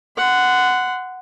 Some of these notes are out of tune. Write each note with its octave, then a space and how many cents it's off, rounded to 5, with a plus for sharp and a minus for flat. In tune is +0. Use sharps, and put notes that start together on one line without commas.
F#5 +0 C6 -30